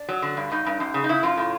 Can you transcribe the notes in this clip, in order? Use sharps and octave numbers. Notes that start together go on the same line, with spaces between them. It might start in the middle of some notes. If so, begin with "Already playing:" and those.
Already playing: D4
F#3
D3
G2
G2 D#4
G2
F#2
C#3
D#4
C#3 E4
F#2 F4
A2